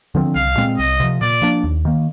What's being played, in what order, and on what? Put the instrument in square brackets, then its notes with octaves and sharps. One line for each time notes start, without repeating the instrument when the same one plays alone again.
[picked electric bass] D3 F3 C4
[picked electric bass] C2 [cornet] F5
[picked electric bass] A#2 G#3 C4
[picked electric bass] C2 [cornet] D#5
[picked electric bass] C3 F3
[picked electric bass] A#2 [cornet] D5
[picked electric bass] F3 A#3 D4
D#2
D#3 A#3